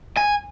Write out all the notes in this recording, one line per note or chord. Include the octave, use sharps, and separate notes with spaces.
G#5